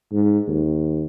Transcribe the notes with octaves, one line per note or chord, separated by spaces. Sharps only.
G#2
D#2